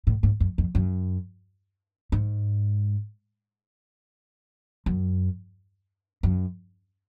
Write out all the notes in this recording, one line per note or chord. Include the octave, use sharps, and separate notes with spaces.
A2
G#2
F#2
F2
F#2
G#2
F#2
F#2